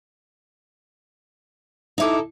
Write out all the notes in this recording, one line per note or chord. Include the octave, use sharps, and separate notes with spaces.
D#4 E4 A4 D#5 E5 D6